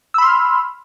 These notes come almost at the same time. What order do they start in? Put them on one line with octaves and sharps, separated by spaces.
E6 B5 C6 F6